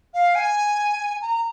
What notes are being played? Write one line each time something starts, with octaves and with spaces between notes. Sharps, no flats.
F5
G#5
A#5